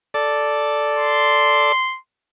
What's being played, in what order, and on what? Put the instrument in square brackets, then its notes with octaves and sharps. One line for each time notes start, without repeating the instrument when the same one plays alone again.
[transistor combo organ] A4 D5
[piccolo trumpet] C6